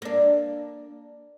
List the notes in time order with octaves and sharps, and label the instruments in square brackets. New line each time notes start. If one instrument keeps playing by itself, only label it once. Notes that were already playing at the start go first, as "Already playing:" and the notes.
[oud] A#3 D4